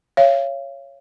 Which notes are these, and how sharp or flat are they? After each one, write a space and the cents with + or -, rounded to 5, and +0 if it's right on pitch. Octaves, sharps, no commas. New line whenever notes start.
C#5 +0 F5 -35